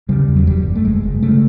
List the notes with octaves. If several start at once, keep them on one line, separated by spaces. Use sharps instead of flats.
C#3 G3
E2
F#3
F#1 G3
F#1
A3
F#1 G#3
F#1
C#3 A3